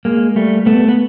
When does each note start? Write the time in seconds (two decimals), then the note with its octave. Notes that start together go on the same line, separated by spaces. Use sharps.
0.05 G#3 A#3
0.36 G3 A3
0.66 A3 B3
0.88 B3